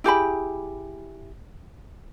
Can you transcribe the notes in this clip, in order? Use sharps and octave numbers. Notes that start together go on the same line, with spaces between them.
E4 G4 G#4 B5